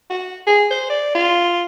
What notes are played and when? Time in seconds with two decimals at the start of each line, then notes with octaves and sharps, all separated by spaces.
0.10 F#4
0.47 G#4
0.71 C5
0.90 D5
1.15 F4